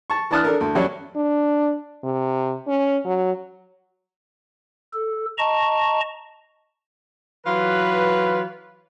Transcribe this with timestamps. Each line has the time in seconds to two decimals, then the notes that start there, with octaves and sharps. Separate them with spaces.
0.10 A5 C#6
0.31 E3 D4 A5 D#6 F6 F#6
0.44 D4 A4 A#4
0.61 D2
0.75 F#2 F#3 G3 C#4
1.16 D4
2.04 C3
2.67 C#4
3.05 F#3
4.94 A4
5.38 D#5 A5 A#5 C#6
7.46 E3 F#3 F4 B4